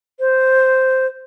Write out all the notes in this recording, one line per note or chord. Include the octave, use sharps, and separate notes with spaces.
C5